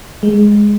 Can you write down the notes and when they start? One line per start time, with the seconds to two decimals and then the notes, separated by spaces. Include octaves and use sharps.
0.23 G#3